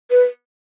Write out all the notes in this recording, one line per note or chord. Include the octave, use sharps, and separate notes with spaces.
B4